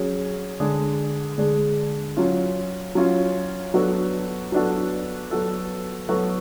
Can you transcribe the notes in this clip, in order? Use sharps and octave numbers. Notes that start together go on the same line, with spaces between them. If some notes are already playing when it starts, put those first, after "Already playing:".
Already playing: F#3 C#4 G#4
D3 G#3 D4 G#4
D3 G#3 D4 G#4
F#3 C#4 F4
F#3 C#4 F4
F#3 B3 D4 F#4 A4
F#3 B3 D4 F#4 A4
F#3 B3 F#4 A4
F#3 B3 F#4 A4